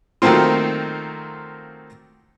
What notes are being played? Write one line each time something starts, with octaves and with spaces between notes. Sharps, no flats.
D#3 F#3 A3 A#3 C4 F4